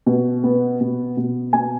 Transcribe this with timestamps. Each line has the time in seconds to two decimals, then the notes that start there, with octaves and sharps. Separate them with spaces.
0.06 B2
0.44 B3
0.81 B2
1.17 B2
1.53 B2 G#5